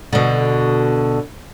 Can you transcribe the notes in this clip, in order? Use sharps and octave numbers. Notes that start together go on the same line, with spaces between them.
B2 D3